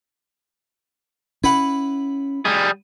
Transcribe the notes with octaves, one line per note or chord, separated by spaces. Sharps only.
C#4 E4 B4 F#5
G3 G#4